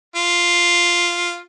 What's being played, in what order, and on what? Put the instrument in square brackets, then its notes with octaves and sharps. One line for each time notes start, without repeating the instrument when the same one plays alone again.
[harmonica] F4